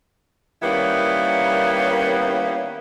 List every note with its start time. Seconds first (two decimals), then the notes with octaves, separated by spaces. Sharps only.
0.63 D#3 G3 A#3 B3 C#4 E4